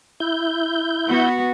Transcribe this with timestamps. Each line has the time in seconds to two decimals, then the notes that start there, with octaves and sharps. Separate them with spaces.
0.20 E4 G6
1.08 B3 F#4